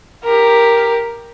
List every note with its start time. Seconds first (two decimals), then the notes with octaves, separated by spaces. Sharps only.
0.24 G4 A#4